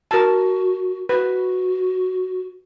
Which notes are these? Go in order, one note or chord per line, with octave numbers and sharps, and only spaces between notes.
F#4 A#4 A5
F#4 B4